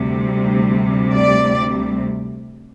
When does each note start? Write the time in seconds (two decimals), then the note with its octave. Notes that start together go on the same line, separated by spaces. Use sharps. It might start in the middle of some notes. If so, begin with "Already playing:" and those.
Already playing: D2 C3 G3
1.12 D5